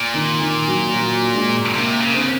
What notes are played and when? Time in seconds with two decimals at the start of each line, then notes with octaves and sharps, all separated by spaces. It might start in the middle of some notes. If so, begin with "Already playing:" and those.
Already playing: A#2
0.14 D#3
0.41 D#3
0.68 F#3
0.94 F#3
1.34 G#3
1.74 C3 A#3
2.01 C#3
2.14 C4